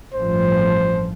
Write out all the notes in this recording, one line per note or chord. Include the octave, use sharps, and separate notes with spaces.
A1 G2 F3 C5